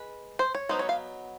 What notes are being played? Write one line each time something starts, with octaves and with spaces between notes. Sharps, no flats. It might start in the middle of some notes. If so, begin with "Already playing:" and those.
Already playing: G#3 B4
C5
C#5
F#3 B3 D#4 C5
C#5
F5